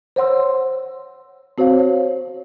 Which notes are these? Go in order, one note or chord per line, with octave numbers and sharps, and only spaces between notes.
C5 C#5 F#5 C6 E6
C4 F#4 C5 C#5 F5
C#5